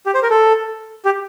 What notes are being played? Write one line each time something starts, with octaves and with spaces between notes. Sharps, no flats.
G4
C5
A#4
A4
G4